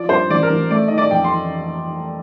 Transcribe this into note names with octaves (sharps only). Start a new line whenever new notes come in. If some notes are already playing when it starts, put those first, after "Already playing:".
Already playing: F3 D5
G2 C5
A1 D5
A#4
A1
A3 D5
D#3 D#5
D5
F2 G5
C6